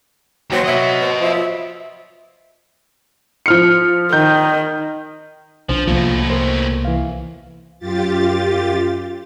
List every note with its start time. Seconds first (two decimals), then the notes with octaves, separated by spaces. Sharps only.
0.52 D#2 F#3 C5
0.65 B4 D#5 E5
1.00 C5
1.21 F3 E5
3.46 F3 F6 C#7
4.13 D#3 G6
5.69 B1 F3 D4 C5
5.88 C2 B2 F3 A3 A#3
6.30 A#4 C5
6.85 E3 F5
7.79 F#2 F4 G4 A6